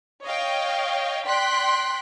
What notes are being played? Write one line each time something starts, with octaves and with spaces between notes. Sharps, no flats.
C#5 D#5 F5 G5
D5 G5 C6 F#6 B6